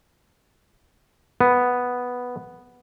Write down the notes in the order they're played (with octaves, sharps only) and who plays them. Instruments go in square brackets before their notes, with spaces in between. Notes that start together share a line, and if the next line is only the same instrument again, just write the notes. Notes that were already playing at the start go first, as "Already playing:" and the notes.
[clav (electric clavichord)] B3